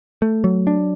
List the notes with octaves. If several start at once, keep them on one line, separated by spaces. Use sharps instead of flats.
A3
F#3
D4